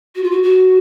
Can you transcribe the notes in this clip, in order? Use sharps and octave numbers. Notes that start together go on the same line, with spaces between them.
F#4
F4
F#4
F#4